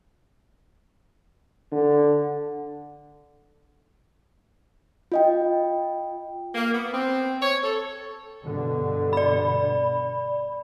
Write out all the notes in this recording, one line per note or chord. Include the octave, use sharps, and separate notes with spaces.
D3
F4 D#5 G5
A#3
B3
C4
C#5
A4
G2 B2 D3
D5 B5